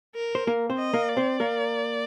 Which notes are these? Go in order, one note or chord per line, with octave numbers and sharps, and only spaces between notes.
A#4
C5
A#3 A#4
C4 C5
D#5
A#3 A#4
D5
C4 C5
A#3 A#4